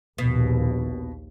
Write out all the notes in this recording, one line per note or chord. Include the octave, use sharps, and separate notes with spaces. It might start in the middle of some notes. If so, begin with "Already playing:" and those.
A#1 D#2 B2